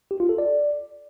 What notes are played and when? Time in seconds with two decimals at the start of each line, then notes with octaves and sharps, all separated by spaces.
0.11 G4
0.20 F4
0.29 A4
0.38 D5